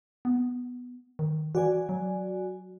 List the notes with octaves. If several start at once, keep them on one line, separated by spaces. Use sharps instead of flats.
B3
D#3
E3 F#4 D5 G#5
F#3